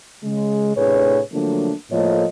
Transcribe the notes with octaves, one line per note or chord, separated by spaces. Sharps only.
C#3 G#3
A2 C3 D4 G#4 B4 C#5
D3 F3 F#3 A3 A#3 D4
A2 F3 A3 A#3 C#5 D#5